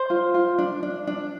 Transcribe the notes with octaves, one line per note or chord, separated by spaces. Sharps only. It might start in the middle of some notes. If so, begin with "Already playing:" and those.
Already playing: C5
F4
F4
D4
D4
D4